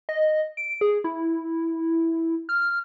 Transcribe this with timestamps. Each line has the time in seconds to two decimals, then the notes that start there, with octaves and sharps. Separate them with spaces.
0.09 D#5
0.57 D7
0.81 G#4
1.04 E4
2.49 F6